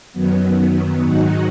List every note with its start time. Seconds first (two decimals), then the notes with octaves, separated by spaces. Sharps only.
0.13 F#2 D#3 F#3 B3
1.02 G#2 D#3 F#3 D#4 F#4